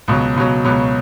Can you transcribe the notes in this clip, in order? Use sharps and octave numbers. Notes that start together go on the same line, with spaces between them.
C#2 B2 F#3
C#2 B2 F#3
C#2 B2 F#3